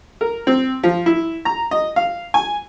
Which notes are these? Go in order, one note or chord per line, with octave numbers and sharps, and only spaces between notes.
A#4
C4
F3
E4
A#5
D#5
F5
G#5